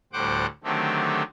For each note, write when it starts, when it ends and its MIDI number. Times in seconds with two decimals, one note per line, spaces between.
0.13 0.46 38
0.13 0.46 45
0.13 0.46 55
0.13 0.46 72
0.13 0.46 78
0.13 0.46 86
0.64 1.22 50
0.64 1.22 51
0.64 1.22 54
0.64 1.22 57
0.64 1.22 60
0.64 1.22 67